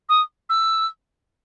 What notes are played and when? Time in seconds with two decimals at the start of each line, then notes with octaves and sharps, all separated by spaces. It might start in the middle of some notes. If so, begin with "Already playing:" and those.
0.09 D#6
0.49 E6